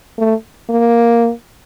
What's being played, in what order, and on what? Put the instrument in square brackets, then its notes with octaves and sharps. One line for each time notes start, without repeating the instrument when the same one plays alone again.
[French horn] A3
A#3